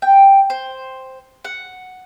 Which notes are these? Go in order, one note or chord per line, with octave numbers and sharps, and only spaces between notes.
G5
C5
F#5